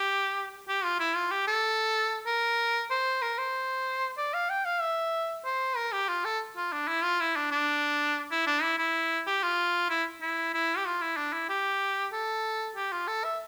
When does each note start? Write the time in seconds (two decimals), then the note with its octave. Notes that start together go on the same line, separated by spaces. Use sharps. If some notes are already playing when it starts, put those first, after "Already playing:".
Already playing: G4
0.69 G4
0.84 F4
1.00 E4
1.16 F4
1.31 G4
1.48 A4
2.27 A#4
2.90 C5
3.22 A#4
3.38 C5
4.18 D5
4.34 F5
4.50 G5
4.65 F5
4.82 E5
5.45 C5
5.76 A#4
5.92 G4
6.09 F4
6.25 A4
6.57 F4
6.73 D4
6.88 E4
7.04 F4
7.20 E4
7.36 D4
7.51 D4
8.31 E4
8.47 D4
8.63 E4
8.78 E4
9.27 G4
9.43 F4
9.90 E4
10.22 E4
10.54 E4
10.77 G4
10.86 F4
11.02 E4
11.17 D4
11.33 E4
11.49 G4
12.13 A4
12.76 G4
12.92 F4
13.08 A4
13.24 E5